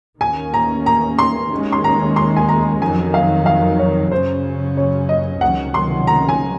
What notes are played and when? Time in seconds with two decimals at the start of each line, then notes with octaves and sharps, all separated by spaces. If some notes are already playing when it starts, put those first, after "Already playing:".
0.21 D#2 D#3 A#3 C#4 G#5
0.54 A#5
0.86 A#5
1.19 C6
1.51 D#2 D#3 G#3 C#4
1.72 C6
1.84 A#5
2.16 C6
2.37 G#5
2.49 A#5
2.81 F2 D#3 F#3 G#5
3.14 F5
3.46 F5
3.79 C#5
4.12 F#2 C#3 F#3 C#4 C5
4.77 C#5
5.09 D#5
5.41 C#2 C3 D#3 F#3 C#4 F#5
5.74 C6
6.07 A#5
6.29 G#5